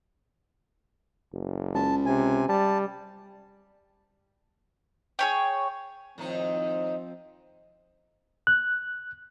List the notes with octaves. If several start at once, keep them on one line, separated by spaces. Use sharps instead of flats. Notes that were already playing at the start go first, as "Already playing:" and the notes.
F#1
C#2 A5
C3 G#5
G3 A5
G#4 C#5 G5
A2 D#3 F3 C4 D#4
F#6